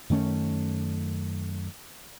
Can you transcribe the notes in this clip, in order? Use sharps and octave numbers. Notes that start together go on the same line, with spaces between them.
F#2 D#3 A3 C#4